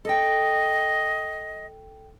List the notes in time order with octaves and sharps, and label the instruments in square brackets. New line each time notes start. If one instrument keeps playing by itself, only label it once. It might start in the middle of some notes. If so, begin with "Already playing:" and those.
[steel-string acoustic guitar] A4 G5 [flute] D#5